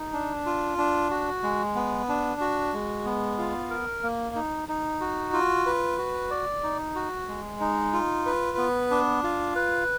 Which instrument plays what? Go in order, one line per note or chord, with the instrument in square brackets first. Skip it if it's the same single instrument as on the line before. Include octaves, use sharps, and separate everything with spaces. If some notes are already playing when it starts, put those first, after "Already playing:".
Already playing: [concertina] D#4
D4
F4
D4
F#4
G#3
B3
D4
F#4
G#3
B3
F4
A#4
A#3
D#4
D#4
F#4
F4
B4
F#4
D5
D#4
F#4
G#3
D#4
F4
B4
B3
D4
F4
B4